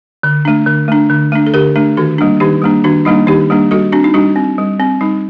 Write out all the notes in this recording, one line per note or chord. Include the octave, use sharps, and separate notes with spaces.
D3
A3 D4
D3
A3 D4
D3
A3 D4
A4
D3 G4 A#4
A3 D4
D#3 F#4 A4
G3 A#3 D4
D#3 D#4 G4
G3 A#3 D4
D#3 D4 F#4
G3 A#3 D4 D#4
D#3 D#4 G4
G3 A#3 D4
G3 F#4 A4
C4 D4 F#4
D#4
G3 D4 F#4
C4
G3
C4
G3 D#4